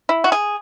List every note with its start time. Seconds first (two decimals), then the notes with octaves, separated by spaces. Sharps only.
0.09 E4
0.24 F#4
0.32 G#4